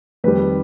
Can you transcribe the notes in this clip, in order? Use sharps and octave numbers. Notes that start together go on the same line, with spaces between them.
F2 D#3 G3 B4